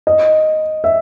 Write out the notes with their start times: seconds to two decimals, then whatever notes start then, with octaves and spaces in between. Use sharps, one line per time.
0.07 D#5
0.84 E5